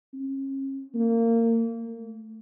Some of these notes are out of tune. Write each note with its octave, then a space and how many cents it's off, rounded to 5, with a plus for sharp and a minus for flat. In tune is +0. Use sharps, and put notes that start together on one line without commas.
C#4 -40
A#3 -25
A3 +0